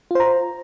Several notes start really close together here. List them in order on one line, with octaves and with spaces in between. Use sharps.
F4 C5 A#5